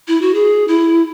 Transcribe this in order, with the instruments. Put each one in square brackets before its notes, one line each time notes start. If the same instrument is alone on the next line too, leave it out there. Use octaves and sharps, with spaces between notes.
[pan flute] E4
F#4
G#4
E4